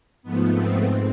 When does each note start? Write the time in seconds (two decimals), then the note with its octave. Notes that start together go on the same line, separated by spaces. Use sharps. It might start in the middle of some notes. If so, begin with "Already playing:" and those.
0.23 G#2 F3 A3 B3
0.53 C4
0.82 G#2